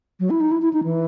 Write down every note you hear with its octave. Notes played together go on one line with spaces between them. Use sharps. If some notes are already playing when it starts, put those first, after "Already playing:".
F#3
E4
D#4
E4
E4
D#4
E3